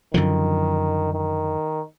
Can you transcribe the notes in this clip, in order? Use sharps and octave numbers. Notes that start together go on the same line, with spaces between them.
F#2 D3 D#3 F3
D#3